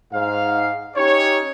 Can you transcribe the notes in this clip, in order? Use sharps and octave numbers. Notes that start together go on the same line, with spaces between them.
G#2 F5
C#4 D#4 G4 C#5